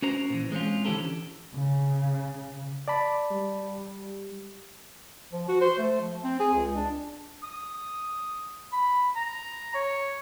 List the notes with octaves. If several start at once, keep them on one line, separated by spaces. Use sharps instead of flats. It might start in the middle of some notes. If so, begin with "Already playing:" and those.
C#4 F#4 A#4 C5 A#5
A#2 E3
G#3 C4 C#4 F4
D3 E3 C#4 G4 A4 A#4
C#3
D5 A5 B5
G3
F3
F#4
C5
A3
F3
C4
G#4
C#2
D4
D#6
B5
A#5
C#5